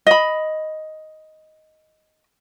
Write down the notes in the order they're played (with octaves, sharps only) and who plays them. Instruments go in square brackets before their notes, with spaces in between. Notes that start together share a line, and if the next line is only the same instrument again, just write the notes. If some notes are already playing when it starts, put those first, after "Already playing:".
[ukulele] D#5 B5